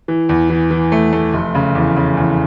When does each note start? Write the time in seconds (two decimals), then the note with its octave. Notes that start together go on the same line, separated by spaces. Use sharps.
0.08 E3
0.29 E2
0.50 E3
0.71 E3
0.92 A3
1.13 A3
1.34 F1
1.55 C#3
1.75 E2
1.97 C#3
2.17 E2